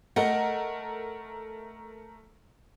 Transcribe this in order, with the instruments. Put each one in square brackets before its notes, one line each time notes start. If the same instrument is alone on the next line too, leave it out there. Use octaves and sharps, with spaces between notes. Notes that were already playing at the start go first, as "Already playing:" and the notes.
[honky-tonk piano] A3 A#4 [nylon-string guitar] D#5 F#5